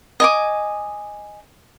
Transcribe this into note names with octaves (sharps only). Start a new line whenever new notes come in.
D#5 G#5 D6